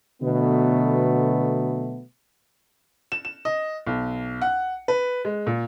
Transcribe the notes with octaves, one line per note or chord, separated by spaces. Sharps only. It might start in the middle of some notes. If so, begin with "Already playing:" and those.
B2 D3 F#3 A3 B3
E7
E7
D#5
B1
F#5
B4
G#3
A#2